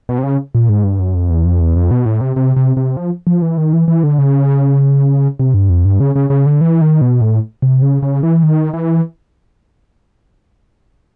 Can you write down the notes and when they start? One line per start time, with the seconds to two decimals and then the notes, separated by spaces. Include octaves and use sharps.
0.09 B2
0.18 C3
0.23 C#3
0.55 A#2
0.69 G#2
0.84 G2
0.99 F#2
1.15 F2
1.30 E2
1.45 F2
1.61 E2
1.76 F2
1.91 B2
2.06 A2
2.21 C3
2.36 C3
2.56 C3
2.77 C3
2.97 F3
3.27 F3
3.42 E3
3.58 D#3
3.73 E3
3.88 E3
4.03 D3
4.18 C#3
5.40 C3
5.54 G2
5.70 F2
5.85 G2
6.00 C#3
6.16 C#3
6.30 C#3
6.46 D3
6.61 E3
6.81 D#3
7.01 B2
7.21 A2
7.62 C3
7.82 C#3
8.02 C#3
8.23 E3
8.43 D#3
8.73 E3